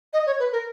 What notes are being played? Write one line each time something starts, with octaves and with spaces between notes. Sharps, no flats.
D#5
C#5
B4
A#4